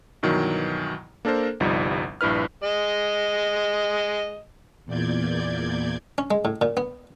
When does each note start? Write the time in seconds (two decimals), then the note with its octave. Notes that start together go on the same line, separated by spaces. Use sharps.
0.23 G2 B2 D#3 E3 F#3
1.25 A#3 D4 A4 A#4 C5
1.60 G1 C2 F3 G3 D#4
2.21 A#1 G2 E4 B4 F6
2.64 G#3 D#5
4.85 E2 A#2 D5 G6 G#6
6.18 C#4
6.31 G#3
6.45 A2
6.61 A#2
6.77 B3